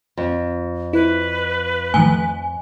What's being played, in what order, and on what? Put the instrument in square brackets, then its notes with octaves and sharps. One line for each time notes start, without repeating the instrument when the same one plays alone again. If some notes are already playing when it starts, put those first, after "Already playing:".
[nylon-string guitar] F2
[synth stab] E4 [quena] B4
[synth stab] A2 D#3 F3 [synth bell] G#5